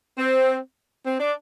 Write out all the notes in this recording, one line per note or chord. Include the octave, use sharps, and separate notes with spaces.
C4
C4
D4